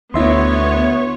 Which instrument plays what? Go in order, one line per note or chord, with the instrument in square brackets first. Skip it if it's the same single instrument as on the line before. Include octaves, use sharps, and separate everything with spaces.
[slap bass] D2 [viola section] B3 C#5 [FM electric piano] E4 E5 C6